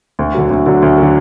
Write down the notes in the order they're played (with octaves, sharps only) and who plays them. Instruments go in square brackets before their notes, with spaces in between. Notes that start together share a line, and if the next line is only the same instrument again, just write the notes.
[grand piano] D2
D3 F#3
D2
D3 F#3
D2
D3 F#3